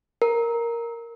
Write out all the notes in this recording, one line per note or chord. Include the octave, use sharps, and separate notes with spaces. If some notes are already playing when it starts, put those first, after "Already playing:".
A#4